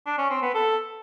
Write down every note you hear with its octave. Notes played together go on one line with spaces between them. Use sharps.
D4
C#4
C4
B3
A4